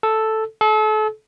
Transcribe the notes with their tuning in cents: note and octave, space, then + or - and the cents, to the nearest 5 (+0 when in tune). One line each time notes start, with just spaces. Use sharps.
A4 +0
A4 -35